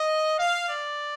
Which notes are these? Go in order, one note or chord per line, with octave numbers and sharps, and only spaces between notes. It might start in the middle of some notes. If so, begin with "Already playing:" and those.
Already playing: D#5
F5
D5